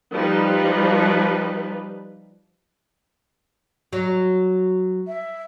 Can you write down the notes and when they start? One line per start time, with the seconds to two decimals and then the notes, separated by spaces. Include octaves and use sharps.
0.13 F3 G3 D#4 B4
3.93 F#3
5.07 E5